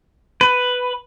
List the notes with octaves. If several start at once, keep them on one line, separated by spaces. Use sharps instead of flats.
B4